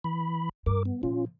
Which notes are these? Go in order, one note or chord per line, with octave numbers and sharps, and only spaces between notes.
E3 B5
G2 A#4 D6
B3
A#2 F3 C#4 F4